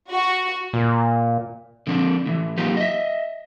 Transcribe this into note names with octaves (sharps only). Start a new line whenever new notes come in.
F#4
A#2
D3 F3 C4 D4
A2 C3 E3
F#3 A#3 D#4 F4 G4 B4
D#5 E5